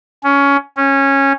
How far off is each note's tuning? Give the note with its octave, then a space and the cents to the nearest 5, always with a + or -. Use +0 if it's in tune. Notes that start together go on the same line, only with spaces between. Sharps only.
C#4 +15
C#4 -15